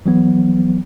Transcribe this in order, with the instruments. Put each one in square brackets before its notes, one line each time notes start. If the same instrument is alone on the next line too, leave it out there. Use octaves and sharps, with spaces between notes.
[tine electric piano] E3 F#3 B3